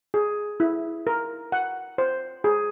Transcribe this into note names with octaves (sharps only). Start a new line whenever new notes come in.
G#4
E4
A#4
F#5
C5
G#4